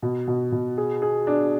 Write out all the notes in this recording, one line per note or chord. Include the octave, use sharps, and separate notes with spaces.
B2
B2
B2
G#4
G#4
D4